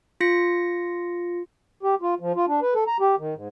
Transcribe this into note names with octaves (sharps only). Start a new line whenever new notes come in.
F4 A#6 C#7
G4
F4
F3
F4
D4
B4
A4
A#5
G4
D#3
G#2